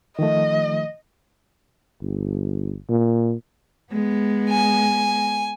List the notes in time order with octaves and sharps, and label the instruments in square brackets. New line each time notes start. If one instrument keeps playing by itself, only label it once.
[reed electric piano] D#3 F3 A3 [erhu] D#5
[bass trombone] G1
A#2
[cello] G#3 B3
[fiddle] G#5